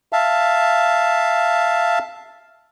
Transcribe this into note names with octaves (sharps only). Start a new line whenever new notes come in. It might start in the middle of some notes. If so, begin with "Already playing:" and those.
E5 F5 A5